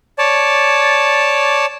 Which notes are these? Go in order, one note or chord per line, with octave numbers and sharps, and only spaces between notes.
C#5 D5 A5